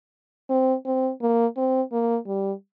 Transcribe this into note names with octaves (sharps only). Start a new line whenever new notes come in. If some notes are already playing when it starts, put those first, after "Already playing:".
C4
C4
A#3
C4
A#3
G3